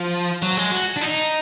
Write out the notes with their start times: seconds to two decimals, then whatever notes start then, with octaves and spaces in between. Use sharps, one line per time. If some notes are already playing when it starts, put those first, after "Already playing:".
Already playing: F3
0.42 F#3
0.57 G#3
0.72 F#4
0.96 D4
1.01 D#4